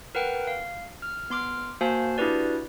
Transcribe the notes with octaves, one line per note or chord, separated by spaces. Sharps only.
A#4 B4 F#5 G5
F5
F6
B3 C6 D6 F6
A#3 F#4 C5 F5 G#5 A5
D4 E4 F#4 G4 B4 D5